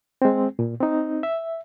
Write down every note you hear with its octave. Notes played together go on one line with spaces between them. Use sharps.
G#3 C4
A#2
C4 D#4
E5